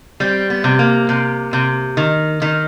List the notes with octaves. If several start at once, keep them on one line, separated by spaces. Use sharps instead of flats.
G3 C4
B3
C3
A#3
C3
C3
D#3
D#3